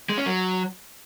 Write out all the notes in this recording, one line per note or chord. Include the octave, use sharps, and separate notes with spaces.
G#3
C#4
F#3